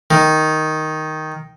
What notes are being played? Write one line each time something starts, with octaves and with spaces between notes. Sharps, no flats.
D#3